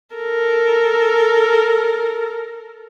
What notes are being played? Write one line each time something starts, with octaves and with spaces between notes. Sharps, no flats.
A4 A#4